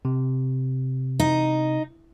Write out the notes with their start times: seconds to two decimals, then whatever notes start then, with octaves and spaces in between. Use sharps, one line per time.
0.05 C3
1.20 D#4